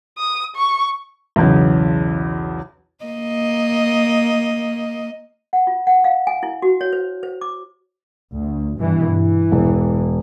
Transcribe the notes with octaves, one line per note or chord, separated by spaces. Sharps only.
D#6
C#6
B1 E2 C#3
A#3 D#5
F#5
F4
F#5
F5
G#5
E4
F#4
C#5
C5
C5
D6
D2
G2 B2 E3
E3
E1